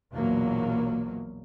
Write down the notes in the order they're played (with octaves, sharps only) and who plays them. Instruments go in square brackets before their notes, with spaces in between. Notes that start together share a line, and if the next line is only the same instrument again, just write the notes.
[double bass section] A#1 E2 B2 F#3 A#3